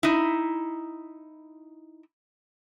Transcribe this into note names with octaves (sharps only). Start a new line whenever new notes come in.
D#4 E4